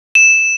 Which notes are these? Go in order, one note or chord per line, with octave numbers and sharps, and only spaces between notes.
E7